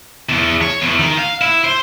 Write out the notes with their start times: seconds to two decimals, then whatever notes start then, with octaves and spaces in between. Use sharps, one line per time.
0.29 E2
0.62 C#5
0.82 E2
0.99 D#3
1.17 F5
1.41 E4
1.64 C5